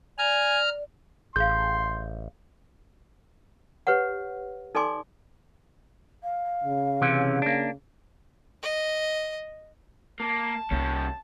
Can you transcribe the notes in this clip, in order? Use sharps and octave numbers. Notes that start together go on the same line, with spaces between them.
D5 G#5 A#5 F6
A1 G#4 F5 C6 G6
G4 B4 C#5 F#5
D#4 A4 D5 G#5 C6 D6
F5
C#3
C3 E3 C#4
A#3 D4
D#5
A#3 A5
C2 G3 A#3 C#4